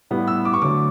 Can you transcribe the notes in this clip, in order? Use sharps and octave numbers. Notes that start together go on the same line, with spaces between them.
A2 G3 B3
E6
D6
C#6
D3 F#3 A3 D6